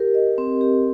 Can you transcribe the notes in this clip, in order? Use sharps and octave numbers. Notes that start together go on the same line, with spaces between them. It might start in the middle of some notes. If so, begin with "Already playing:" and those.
Already playing: G4 A#4
D#5
C4
G4